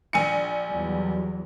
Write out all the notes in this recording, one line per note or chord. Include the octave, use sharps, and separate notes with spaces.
A#1 G#5 C#7
E2 F#3 G3